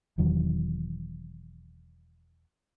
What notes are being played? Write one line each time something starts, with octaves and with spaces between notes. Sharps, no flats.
E1 E2 D#3 F#3